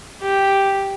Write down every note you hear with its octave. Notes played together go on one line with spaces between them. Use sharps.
G4